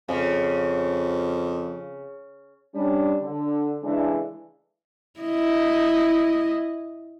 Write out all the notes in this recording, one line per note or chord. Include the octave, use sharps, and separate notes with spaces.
F2 C#3
G3 C#4 D4
D3
C#3 E3 G#3 A3 D4
E4 D#5